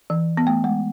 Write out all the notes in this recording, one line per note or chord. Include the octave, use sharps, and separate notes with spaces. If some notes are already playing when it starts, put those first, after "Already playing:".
E3
B3
A3
G#3